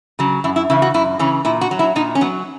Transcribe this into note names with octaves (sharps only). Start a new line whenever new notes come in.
C#3 F#3
F#2 E4
E4
C#3 E3 E4
F#4
F#2 E4
C#3 E3 C#4
A#2 E4
F#4
F#3
E4
A#2 D#4
C#4
F#3 B3